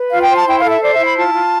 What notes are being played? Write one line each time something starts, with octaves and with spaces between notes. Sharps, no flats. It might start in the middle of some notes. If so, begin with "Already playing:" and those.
Already playing: B4
F4 F5
G5
C5
A5
E4 G5
F5
A4
E5
C5 D5
E5
E4
B5
F4 A5
F4